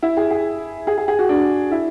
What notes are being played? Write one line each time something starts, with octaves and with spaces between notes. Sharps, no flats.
E4
G#4
G#4
G#4
G#4
G#4
F#4
D4
E4